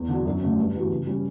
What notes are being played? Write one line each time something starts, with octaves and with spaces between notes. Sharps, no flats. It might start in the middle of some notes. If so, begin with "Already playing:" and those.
Already playing: E2
D3 F#3
F#2
D3 A3 C#4
G2
E3 G3 B3 F#4
C#3
G3 C#4